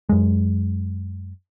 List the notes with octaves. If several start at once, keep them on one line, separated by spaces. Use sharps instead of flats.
F#2 G#3